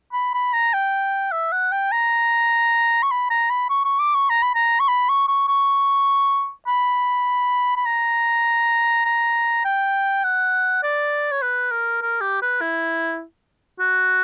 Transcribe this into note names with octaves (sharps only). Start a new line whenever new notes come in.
B5
B5
A#5
G5
E5
F#5
G5
A#5
C#6
B5
A#5
B5
C#6
C#6
D6
C#6
A#5
B5
A#5
C#6
B5
C#6
C#6
C#6
B5
B5
A#5
A#5
G5
F#5
D5
C#5
B4
A#4
A#4
G4
B4
E4
F#4